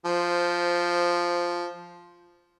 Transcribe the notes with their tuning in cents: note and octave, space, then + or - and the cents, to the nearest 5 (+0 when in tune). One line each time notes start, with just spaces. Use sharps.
F3 +0 C5 -10